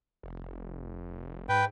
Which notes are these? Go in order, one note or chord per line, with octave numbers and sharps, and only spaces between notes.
F1
G#2 B4 G5